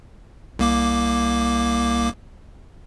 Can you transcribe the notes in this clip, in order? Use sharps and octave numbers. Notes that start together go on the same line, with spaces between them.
C2 A#3 D6